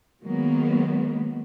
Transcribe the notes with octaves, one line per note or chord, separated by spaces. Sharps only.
D#3 F#3 G#3 A#3 B3